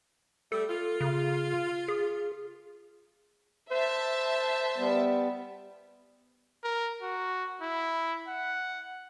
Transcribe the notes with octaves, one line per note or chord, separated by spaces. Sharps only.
G3 A3 A4
F4
C#3
G#4
C5 E5 A5
G3 B3
A#4
F#4
E4
F#5